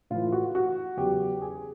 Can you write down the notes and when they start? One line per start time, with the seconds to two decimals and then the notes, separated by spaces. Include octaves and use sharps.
0.10 A2 E3 F4
0.32 F#4
0.55 F#4
0.97 E2 C#3 F#3 G4
1.41 G#4